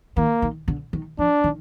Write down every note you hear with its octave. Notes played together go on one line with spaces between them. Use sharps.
D#3 A#3
D#3
D3
D#3
F3 D4
D#3